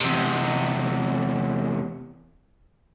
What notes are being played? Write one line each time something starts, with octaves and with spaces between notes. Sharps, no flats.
E2 C3